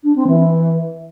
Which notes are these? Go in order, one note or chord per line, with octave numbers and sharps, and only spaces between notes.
D4
C4
E3